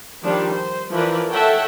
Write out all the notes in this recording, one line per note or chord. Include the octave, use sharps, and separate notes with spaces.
D#3 F3 G3 D4
C5
E3 F3 A#4 B4 D5
A4 C#5 E5 F#5 G5 A5